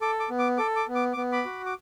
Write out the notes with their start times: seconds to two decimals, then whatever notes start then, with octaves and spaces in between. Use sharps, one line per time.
0.01 A4 D6
0.20 D6
0.30 B3
0.39 D6
0.57 A4 D6
0.76 D6
0.88 B3
0.95 D6
1.13 B3 D6
1.32 B5 D6
1.45 F#4
1.66 D6